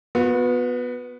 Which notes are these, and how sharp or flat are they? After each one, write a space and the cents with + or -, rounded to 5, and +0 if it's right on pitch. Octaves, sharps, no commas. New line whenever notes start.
B3 +0 F#4 -45